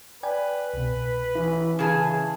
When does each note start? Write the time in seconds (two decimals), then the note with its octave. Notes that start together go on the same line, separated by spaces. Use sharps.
0.23 B4 D5 G5 G#5
0.74 C2 B2
1.35 E3 E4
1.79 C#3 E3 G#4 A5